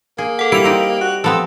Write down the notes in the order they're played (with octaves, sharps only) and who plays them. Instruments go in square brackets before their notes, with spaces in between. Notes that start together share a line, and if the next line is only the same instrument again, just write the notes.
[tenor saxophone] A#3 [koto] G#4
[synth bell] A4 F#5
[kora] G3 [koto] E4 [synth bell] D7 F7
[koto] C4 D#4 G4
[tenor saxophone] F#4
[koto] F3 B3 C4 [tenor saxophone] A4